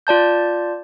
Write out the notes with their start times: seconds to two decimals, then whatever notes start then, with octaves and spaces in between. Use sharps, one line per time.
0.07 F4 D5 A5 G6